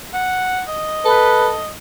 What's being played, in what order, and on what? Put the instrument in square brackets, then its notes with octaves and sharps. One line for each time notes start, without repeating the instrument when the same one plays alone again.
[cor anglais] F#5
D#5
[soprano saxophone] A4 [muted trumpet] B4